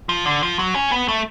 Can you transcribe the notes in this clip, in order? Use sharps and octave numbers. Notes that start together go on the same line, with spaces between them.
F3
D3
F3
F#3
C#4
B3
A3